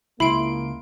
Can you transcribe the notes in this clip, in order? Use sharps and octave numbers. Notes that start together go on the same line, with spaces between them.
C#2 A#3 E4 B5 C6 D7